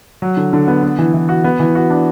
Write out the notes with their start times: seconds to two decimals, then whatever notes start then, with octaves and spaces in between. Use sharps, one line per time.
0.22 F#3
0.37 D3
0.53 D3
0.68 B3
0.83 B3
0.98 E3
1.14 E3
1.29 F#4
1.44 B3
1.60 E3
1.75 F#4
1.90 D4